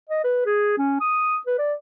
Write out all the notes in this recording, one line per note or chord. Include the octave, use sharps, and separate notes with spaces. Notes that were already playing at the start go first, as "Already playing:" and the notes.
D#5
B4
G#4
C#4
D#6
B4
D5